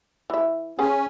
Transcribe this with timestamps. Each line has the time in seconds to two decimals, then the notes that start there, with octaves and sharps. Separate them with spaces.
0.30 E3 E5
0.79 C#4 G#4 C5 G#5